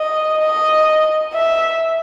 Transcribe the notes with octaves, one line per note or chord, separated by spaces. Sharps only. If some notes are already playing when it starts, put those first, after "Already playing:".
Already playing: D#5
D#5
E5